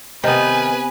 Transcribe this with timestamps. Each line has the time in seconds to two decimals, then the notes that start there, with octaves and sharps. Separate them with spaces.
0.24 C3 D#3 B3 B4 G#5